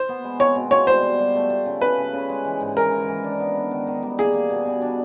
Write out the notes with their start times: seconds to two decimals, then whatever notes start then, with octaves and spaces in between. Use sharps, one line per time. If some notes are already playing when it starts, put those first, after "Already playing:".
Already playing: C5
0.09 B3
0.24 G#3
0.40 C4 C#5
0.55 B2
0.71 F4 C#5
0.87 G3 C5
1.03 B2
1.19 G3
1.35 A3
1.50 A3
1.66 C#3
1.81 C#3 B4
1.98 C#3
2.13 C#3
2.29 G#3
2.45 E3
2.61 G#2
2.77 E3 A#4
2.92 E3
3.08 E3
3.24 D4
3.40 B3
3.56 D4
3.71 D#3
3.87 D#3
4.03 G3
4.18 A#3 G#4
4.34 A#3
4.50 B2
4.66 B2
4.82 D4